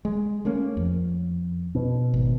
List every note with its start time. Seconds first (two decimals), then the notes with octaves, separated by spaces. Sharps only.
0.05 G#3
0.45 A3 A#3 C#4
0.77 F2
1.75 B2
2.14 G#1